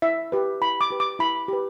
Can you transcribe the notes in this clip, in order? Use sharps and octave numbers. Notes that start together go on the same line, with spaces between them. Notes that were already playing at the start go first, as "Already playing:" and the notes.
E4 E5
G4 B4
E4 B5
D6
G4 B4
D6
E4 B5
G4 B4